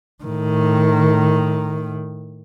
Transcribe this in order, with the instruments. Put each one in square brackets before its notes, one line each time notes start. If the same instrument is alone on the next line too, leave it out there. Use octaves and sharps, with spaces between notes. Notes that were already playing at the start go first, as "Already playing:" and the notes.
[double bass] A2 D#3